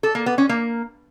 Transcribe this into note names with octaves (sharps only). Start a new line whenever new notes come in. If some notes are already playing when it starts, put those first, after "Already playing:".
A4
A#3
B3
C#4
A#3